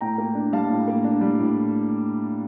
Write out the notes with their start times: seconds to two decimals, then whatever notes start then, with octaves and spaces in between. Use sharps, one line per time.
0.01 A2 G5 A#5
0.18 A#3
0.35 D4
0.52 G3 F5 A5
0.70 A2
0.88 A#3
1.04 D4
1.21 G3
1.39 A2